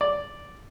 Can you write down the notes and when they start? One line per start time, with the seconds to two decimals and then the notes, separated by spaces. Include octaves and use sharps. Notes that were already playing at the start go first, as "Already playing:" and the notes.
0.01 D5